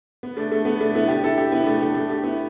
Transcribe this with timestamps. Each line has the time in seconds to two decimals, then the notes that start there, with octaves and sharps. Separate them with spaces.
0.23 B3
0.37 A3 D4
0.52 A3
0.65 B3
0.81 A3 D4
0.95 B3 E4
1.08 D4 G4
1.24 E4 A4
1.37 D4 G4
1.52 B3 E4
1.66 A3 D4
1.81 D4 G4
1.95 A3 D4
2.09 D4 G4
2.23 B3 E4